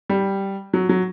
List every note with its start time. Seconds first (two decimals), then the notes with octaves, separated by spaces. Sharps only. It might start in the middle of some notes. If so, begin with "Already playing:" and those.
0.10 G3
0.73 F#3
0.89 F#3